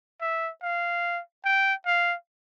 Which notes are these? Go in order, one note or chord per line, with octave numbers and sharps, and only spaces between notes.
E5
F5
G5
F5